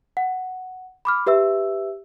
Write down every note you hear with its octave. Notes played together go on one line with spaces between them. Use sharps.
F#5
B5 D6 F6
G4 B4 E5 E6